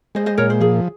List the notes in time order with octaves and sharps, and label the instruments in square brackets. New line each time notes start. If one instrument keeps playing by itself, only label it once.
[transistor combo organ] G#3 [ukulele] C5 D#5
[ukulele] C5 D#5
[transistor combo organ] A#2 [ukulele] A#4 C#5
[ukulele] C5
[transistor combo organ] F3 [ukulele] G#4